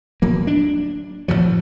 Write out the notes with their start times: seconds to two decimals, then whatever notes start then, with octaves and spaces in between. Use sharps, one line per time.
0.22 D1 F#3 A#3
0.47 D4
1.28 A2 C3 F3 F#3